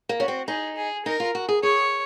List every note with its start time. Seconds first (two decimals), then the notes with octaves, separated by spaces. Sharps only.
0.09 A#3
0.19 C#4 F#4
0.28 C4
0.47 D#4 G#4
0.76 G#4
1.05 D#4 A#4
1.20 F4
1.35 F#4
1.49 G#4
1.63 G#4 C#5